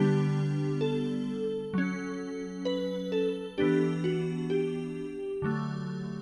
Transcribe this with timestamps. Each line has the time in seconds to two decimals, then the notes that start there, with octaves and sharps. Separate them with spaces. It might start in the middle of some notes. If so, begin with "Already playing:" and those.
Already playing: D3 G3 B3 D4 G4
0.81 A4
1.74 F#3 C#4
2.65 B4
3.12 A4
3.58 E3 B3 D4 G4
4.04 F#4
4.50 G4
5.42 D3 F#3 A3